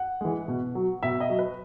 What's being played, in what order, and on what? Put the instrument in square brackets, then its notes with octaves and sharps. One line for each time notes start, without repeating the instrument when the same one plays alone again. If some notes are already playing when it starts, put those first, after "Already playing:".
Already playing: [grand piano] F#5
E3 G#3
B2
F#3
B2 E5
D#5
F#3
B4